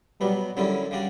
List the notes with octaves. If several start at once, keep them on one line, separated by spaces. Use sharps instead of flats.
B2 F#3 G3 B3
F#2 D3 F#3 G3 C#4 E4
C#3 G3 D4 F#4